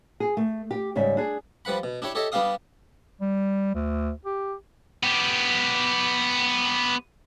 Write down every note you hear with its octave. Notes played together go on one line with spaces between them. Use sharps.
G#4
A3
G4
G#2 C#3 G3 E5
D4 G#4
F3 G3 B4 F#5 B5
B2
D4 E4 G4 C#5
G4 A4 C#5 D#5 E5
G3 B3 D4 G4 F5 D#6
G3
D2
G4
B3 G4